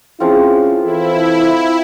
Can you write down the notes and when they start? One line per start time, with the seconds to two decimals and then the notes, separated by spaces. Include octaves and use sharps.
0.20 F3 C4 C#4 E4 F4 G#4
0.84 E3 E4 A4 C5